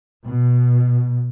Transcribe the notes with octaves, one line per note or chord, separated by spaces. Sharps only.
B2